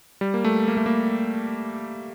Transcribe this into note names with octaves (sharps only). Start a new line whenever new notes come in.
G3
A#3
A3
A#3
A3
A#3